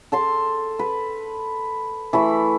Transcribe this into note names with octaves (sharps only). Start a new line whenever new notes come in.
A4 A5 C6
B4
E3 A3 B5